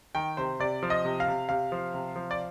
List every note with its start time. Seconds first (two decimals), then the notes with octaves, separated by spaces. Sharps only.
0.15 D#3 G5
0.37 C3 C5
0.60 C3 D5
0.83 F3
0.90 D#5
1.05 C3
1.20 F5
1.27 C3
1.49 C3 F5
1.72 F3
1.94 C3
2.16 F3
2.31 D5